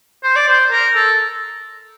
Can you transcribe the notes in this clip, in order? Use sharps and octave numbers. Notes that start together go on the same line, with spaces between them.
C5
D5
C5
A#4
A4